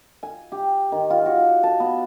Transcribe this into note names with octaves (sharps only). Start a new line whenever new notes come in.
G#5
G4
D#3
F4
F#4
A5
B3